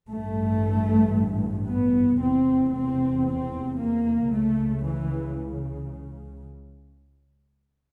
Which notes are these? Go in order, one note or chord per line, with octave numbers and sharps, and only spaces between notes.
A1 G2 A3
B3
F1 E2 C3 C4
C4
C4
A#3
C#2 C#3 A3
E3